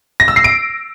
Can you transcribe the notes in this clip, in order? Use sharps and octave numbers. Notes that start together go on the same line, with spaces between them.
A#6
E6
C7
D7